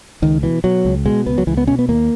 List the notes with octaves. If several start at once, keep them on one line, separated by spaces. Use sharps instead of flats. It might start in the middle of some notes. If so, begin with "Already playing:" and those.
C#2 D#3
B2 E3
B2 F#3
C#2
B2 G#3
C#2 B3
F#3
C#2 E3
B3
B2 C#4
B3
D#2 A#3